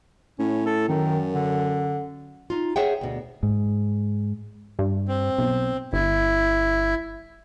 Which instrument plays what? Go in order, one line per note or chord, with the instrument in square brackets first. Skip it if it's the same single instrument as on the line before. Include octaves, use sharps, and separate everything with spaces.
[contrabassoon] A2 [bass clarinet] C#4
[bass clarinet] A4
[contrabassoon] F#2 [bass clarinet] D#3
[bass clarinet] D3
[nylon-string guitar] D#4 F4
G#4 C5 C#5 E5 F#5 G5
D2 B2
[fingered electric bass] G#2
[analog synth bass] G2
[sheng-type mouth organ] C4
[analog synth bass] B1
[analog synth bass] G1 [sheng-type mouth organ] E4